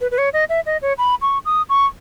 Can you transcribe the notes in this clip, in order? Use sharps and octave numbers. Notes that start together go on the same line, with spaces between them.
B4
B4
C#5
D#5
E5
D#5
C#5
B5
C#6
D#6
C#6